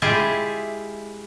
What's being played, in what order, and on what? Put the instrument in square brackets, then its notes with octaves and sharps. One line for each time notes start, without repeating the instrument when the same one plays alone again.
[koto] G#3 E4 F4 G4 G#4 E5